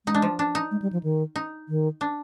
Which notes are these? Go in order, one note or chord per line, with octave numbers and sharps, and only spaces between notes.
G#3 D#4
D4
F3
D4
D#4
G#3
G3
F3
D#3
D#4
D#3
D4